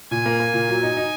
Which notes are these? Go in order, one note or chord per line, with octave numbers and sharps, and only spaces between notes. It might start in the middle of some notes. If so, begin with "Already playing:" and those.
A#2 G#5
A#3
A#3
A#2
F#3
D#4
D#4